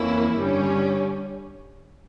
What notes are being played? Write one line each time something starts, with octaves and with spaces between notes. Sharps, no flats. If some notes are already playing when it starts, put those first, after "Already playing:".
Already playing: F2 E3 A#3 C#4 E4
G2 D3 G3 C#4